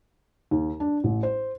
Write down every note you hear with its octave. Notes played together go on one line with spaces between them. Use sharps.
D#2
D4
A1
C5